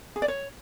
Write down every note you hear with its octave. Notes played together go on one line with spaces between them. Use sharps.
G#4
D5
C#5